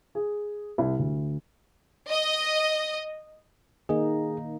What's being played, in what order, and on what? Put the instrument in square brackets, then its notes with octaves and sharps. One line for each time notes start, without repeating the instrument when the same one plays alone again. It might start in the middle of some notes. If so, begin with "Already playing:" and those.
[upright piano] G#4
C2
D2
[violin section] D#5
[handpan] D#3 A#3 D#4 [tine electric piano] G#4